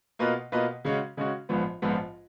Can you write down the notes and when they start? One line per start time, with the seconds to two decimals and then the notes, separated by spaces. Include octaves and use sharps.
0.19 B2 A#3 F4 B4 D#5
0.52 B2 A#3 F4 B4 D#5
0.85 C#3 G#3 C#4 F#4
1.17 C#3 G#3 C#4 F#4
1.49 A#1 G#2 F3 B3
1.82 A#1 G#2 F3 B3